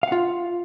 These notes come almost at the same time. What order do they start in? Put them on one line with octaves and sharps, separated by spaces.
F5 F#5 F4